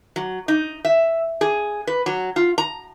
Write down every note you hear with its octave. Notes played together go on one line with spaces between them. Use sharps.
F#3
D#4
E5
G#4
B4
F#3
F4
A#5